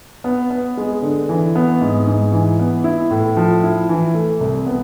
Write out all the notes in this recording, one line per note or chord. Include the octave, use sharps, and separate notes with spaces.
B3
B3
G#3
D3
E3
B3
G#2
G#2
E3
B3
E4
A2
F3
E4
E3
A3
C2
B3